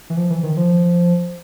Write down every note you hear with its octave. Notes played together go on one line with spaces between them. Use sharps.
E3
F3
E3
D#3
F3